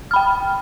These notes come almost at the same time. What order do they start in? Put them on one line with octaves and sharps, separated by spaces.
F6 B5 G5